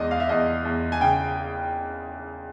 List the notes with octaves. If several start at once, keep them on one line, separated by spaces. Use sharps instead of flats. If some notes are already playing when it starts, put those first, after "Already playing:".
Already playing: E2 G#3 D5 D#5
F5
E5
E2 D#5
E2
G#5
C#3 G5